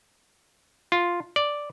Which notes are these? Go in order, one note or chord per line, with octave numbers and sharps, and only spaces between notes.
F4
D5